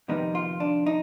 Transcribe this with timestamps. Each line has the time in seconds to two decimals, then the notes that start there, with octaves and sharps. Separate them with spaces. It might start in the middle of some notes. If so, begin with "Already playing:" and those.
0.08 F2 C3 D#3 G3 B3 D#4
0.35 F4
0.60 D4
0.86 D#4